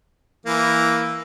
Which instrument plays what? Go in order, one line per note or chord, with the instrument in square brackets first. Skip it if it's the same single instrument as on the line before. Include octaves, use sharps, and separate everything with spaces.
[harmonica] E3 A#3